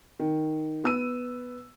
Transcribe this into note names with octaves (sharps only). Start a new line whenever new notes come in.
D#3
B3 E6 D#7